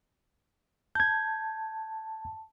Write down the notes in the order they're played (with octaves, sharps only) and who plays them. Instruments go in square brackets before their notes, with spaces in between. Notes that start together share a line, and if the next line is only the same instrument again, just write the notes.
[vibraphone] A5 [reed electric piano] G6 G#6